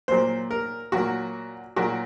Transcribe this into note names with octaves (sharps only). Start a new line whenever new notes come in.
A#2 F#3 A#3 C5
A#4
A#2 F#3 A#3 F#4
A#2 F#3 A#3 F#4